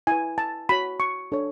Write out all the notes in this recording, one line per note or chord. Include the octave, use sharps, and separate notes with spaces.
E4 B4 G#5
A5
F#4 C#5 B5
C#6
D4 A4 C#5